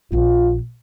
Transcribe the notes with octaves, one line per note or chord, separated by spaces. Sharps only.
A#1 B3 F4